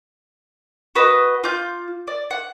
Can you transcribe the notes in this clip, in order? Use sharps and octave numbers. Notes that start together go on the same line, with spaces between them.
F#4 B4 D#5
F4 D6 G6
D5
F#5